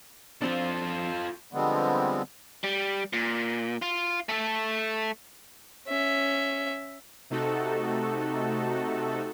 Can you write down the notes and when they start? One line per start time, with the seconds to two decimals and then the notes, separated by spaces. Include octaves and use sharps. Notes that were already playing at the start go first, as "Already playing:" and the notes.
0.42 F3 C4 D4 F4 A4
1.53 D3 F3 G3 G#3 B3 C4
2.64 G3
3.13 A#2
3.82 F4
4.29 A3 A4
5.87 C#4 E5
7.30 C3 A3 D#4 F#4 A4